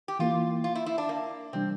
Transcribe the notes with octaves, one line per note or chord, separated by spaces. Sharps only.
G4
E3 A#3 E4 F4
F4
E4
E4
D4
A#3
C3 E3 G3 C4 D4